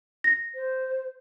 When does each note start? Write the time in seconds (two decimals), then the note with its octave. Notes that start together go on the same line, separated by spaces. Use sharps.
0.24 A#6
0.54 C5